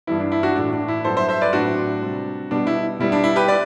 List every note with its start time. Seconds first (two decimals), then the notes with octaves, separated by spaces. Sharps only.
0.07 G2 E3 G3 B3 E4
0.20 D4
0.32 E4
0.43 D4 F#4
0.55 A2 E3 A3 D4
0.73 D4
0.88 E4
1.05 G2 F#3 B3 A4 C5
1.17 C5 E5
1.29 C5 E5
1.41 B4 D5
1.53 A2 F#3 C4 D4 F#4
2.02 C3 G3 C4
2.51 B2 G3 B3 D4
2.67 E4
3.00 B2 G3 B3 E4
3.12 D4
3.24 E4
3.36 G4 B4
3.48 B4 D5